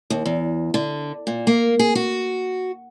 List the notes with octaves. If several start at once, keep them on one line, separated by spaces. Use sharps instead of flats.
D#2
E2
D3
A#2
A#3
G#4
F#4